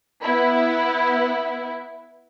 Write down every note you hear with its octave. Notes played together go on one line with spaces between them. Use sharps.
B3 E4